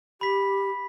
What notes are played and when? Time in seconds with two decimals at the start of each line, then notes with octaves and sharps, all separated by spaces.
0.21 G4 B5 B6